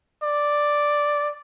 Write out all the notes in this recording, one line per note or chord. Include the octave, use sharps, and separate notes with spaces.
D5